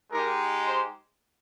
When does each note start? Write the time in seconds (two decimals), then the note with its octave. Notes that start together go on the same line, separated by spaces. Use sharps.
0.11 G#3 D#4 G4 A#4
0.64 C5